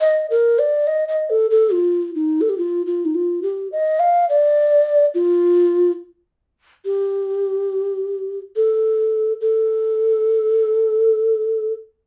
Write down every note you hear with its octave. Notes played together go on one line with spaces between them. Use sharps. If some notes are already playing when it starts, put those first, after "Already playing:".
D#5
A#4
D5
D#5
D#5
A4
A4
F4
D#4
A4
G4
F4
F4
D#4
F4
G4
D#5
F5
D5
F4
G4
A4
A4